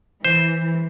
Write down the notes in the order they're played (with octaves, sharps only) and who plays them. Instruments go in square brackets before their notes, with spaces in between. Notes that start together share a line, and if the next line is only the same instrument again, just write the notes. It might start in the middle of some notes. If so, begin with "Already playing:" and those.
[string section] E3 [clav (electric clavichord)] C5